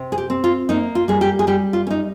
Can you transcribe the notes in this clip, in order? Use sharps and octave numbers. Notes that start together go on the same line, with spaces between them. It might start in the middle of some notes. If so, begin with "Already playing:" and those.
Already playing: C3
G#4
G4
C4
F4
A#3 D#4
F4
G3 G#4
G4
G#4
G3 G4
F4
C#4
D#4